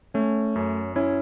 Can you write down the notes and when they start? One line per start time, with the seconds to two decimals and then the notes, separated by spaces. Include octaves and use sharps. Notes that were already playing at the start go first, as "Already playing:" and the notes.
0.14 A3 C#4
0.56 F#2
0.96 C#4 E4